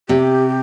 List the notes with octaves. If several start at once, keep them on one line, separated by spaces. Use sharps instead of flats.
C3 G4